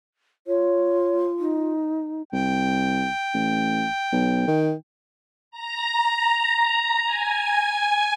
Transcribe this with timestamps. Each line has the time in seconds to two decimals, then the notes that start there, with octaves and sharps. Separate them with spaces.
0.47 F4 C#5
1.39 D#4
2.33 C2 G5
3.34 A1
4.12 B1
4.47 D#3
5.51 A#5
7.06 G#5